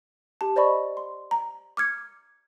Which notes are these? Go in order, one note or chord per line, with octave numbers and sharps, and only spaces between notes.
G4 A5
C5 D5 D#5 B5 C#6
C6
A#5
D6 F6 G#6 C#7